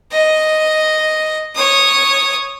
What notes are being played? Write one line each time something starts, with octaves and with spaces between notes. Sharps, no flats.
D#5
C#5 D#6